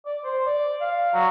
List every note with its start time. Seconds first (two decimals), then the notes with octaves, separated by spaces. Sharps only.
0.06 D5
0.24 C5
0.47 D5
0.81 F5
1.13 F#3